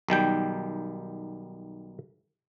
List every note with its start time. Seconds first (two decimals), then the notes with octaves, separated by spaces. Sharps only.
0.09 B1 D#3 G3 G5